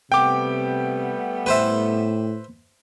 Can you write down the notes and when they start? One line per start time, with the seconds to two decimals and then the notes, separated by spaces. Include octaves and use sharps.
0.12 C3 G3 A3 B3 G5 D6
1.46 A2 B4 C5 E5